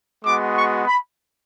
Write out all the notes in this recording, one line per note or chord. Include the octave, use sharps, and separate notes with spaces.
G#3 B3 F#4 D6
C#6
B5